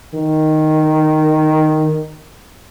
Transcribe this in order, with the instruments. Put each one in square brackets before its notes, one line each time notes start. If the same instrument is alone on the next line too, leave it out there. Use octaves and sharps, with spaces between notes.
[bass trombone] D#3